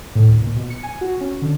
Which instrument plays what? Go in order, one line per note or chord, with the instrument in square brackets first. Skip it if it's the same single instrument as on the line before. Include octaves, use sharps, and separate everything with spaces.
[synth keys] A2
D2
A#2
B2
C#7
G#5
F#4
C#4
D3